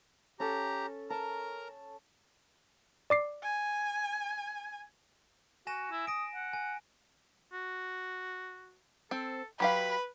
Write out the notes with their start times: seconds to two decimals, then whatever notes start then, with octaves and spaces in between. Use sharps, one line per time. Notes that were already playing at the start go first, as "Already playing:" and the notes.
0.40 C#4 G4 A4 A#5
1.10 A#4 A5 A#5
3.10 D5 D6 C7
3.43 G#5
5.67 F#4 G#5 A#6 E7
5.91 E4
6.07 D#6 A#6 D7
6.35 F#5
6.53 G#5
7.53 F#4
9.11 C4 A4
9.60 F#3 G4 B4 F5 B5